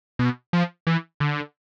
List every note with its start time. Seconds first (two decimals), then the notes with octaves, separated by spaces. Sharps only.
0.19 B2
0.53 F3
0.87 E3
1.20 D3